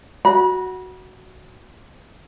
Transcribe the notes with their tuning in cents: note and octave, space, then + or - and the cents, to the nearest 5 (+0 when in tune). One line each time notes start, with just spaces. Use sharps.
F#4 +0 B5 -35